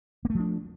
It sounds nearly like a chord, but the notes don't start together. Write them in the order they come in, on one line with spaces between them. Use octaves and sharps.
A#3 A3 F3 D4